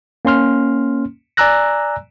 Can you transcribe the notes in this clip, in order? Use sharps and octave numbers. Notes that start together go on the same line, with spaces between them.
A#3 C#4 C6 F6
D5 G#5 A#5 E6 F#6 A#6